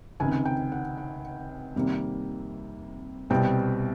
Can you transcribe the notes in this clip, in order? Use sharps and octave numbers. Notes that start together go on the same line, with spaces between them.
C#2 C3 D#3 G#5
G5
F#5
F#5
F2 C3 D#3 G3 A#3
C2 B2 G3 C4 G5